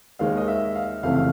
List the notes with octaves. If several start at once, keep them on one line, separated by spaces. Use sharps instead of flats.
D#2 D#3 G#3 F5
D#5
E5
F5
F#1 F2 C3 E3 A3 F5
F5